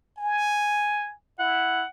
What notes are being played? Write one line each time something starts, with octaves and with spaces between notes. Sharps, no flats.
G#5
E4 F#5